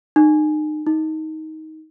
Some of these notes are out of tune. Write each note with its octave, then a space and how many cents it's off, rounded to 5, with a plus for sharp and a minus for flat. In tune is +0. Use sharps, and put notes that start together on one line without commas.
D#4 -30
D#4 +15